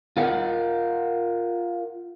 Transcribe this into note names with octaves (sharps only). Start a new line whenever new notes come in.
F4 A#4 F#5